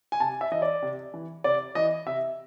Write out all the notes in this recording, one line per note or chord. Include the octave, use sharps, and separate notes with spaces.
G#5
C3 A5
E5
E3 D#5
D5
C3
E3
C3 D5
E3 D#5
C3 E5